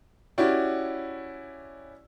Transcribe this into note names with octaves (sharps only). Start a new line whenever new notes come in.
C#4 E4 F#4 G4 D5